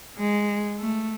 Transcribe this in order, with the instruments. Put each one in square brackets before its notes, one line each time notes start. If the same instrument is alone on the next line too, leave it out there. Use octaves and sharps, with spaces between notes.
[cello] G#3
A3